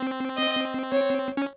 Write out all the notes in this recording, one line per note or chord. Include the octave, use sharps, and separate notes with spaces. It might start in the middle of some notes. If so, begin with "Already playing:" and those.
Already playing: C4
D#5
C#5
C#4